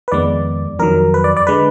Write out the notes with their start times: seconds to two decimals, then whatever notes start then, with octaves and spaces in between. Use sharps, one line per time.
0.08 B4
0.12 F2 D#3 G#3 B3 D5
0.79 F2 D#3 F#3 A#4
1.14 B4
1.24 D5
1.37 D5
1.47 D3 G#3 B4